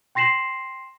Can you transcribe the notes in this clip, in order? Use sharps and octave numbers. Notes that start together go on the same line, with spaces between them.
G5 C6 A#6 C7 E7 F#7